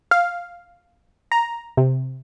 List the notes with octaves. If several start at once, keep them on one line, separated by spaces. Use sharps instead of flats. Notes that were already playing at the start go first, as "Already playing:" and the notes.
F5
A#5
C3